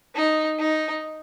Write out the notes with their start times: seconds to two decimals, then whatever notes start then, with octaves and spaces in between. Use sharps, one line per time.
0.15 D#4
0.59 D#4